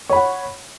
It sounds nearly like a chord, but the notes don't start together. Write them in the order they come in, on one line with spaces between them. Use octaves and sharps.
C#5 B5 F#5